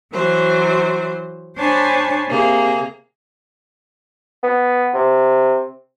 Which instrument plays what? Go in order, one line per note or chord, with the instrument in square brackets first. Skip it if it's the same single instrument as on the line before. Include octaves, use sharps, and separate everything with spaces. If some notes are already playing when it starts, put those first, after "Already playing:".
[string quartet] E3 F#3 C5
D4 C5 C#5 G#5 A5 B5
C3 A#3 G#4
[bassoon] B3
C3